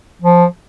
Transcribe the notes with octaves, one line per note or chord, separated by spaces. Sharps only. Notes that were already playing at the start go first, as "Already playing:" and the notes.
F3